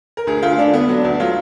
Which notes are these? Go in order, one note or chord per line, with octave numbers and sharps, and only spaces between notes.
A#4
D2 G#4
D2 F4
D3 D4
D3 B3
F#3
D4
D2
F#3 F4